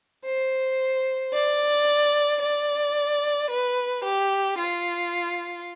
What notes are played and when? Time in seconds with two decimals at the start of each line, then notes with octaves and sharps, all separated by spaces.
0.25 C5
1.33 D5
2.41 D5
3.50 B4
4.04 G4
4.58 F4